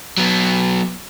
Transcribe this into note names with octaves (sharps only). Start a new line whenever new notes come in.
F#3 B3